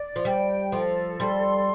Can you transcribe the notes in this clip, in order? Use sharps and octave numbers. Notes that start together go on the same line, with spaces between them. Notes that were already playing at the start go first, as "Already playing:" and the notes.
Already playing: D5
F3
G3 G5
F3 A4
G3 C6